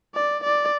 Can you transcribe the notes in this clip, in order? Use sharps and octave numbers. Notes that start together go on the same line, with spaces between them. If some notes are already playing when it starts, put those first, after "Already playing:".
D5
D5